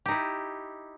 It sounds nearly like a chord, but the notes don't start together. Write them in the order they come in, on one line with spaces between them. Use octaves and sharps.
G4 D#4 E4